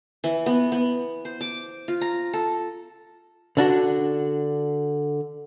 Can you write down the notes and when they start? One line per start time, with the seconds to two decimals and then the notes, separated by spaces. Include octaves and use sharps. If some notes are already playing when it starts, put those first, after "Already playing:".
0.24 E3
0.46 B3
0.72 B3
1.25 C5
1.41 D6
1.88 F4
2.01 A#5
2.33 A4
3.57 D3 D4 F#4